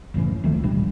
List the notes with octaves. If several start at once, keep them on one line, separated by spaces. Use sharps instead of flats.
F#1 A2 C#3 E3
D2 D#3 F3 A3
A1 B2 G3 D4